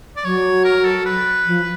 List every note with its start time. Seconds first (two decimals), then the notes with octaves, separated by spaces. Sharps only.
0.16 D5
0.24 F#3 C#5
0.65 A#4
0.85 A4
1.05 B4
1.46 F3